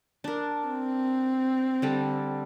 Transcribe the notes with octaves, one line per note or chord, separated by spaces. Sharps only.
D4 A#4
C4
D3 G3 A4